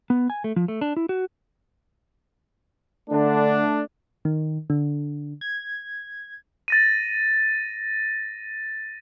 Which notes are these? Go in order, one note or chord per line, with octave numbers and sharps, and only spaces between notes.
B3
G#5
A3
F3
A3
D4
E4
F#4
D3 A3 D4
D#3
D3
G#6
A6 A#6 D#7